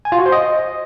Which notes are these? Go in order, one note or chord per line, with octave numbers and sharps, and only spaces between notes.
G#5
F4
F#4
C5
D#5